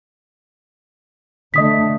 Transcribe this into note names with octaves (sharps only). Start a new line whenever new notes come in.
D3 A3 D#5 D#6 B6